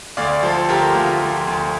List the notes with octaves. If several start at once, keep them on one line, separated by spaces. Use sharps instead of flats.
D2 D5 F5
F3 A4 C5
D2 G4 A#4
D2 F4
F3
D2